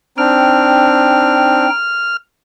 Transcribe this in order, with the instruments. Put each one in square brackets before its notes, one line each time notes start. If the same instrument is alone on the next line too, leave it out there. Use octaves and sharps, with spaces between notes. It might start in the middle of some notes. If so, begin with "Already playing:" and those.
[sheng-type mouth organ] C4 D4 [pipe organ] D#4 G5 [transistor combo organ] F6